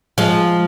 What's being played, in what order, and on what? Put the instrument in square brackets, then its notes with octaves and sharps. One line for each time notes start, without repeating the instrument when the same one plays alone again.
[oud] F3 G#3